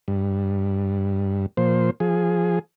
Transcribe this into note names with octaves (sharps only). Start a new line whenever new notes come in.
G2
A#2 F3 C5
F3 G#4